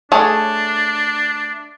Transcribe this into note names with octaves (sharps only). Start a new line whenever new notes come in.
A3 D4 G#4 C#5